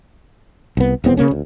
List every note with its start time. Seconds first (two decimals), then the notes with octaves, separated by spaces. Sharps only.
0.77 C2 B3
1.04 D#1 E2 B3 C4
1.17 C#3 F#3 A#3 C#4
1.31 D2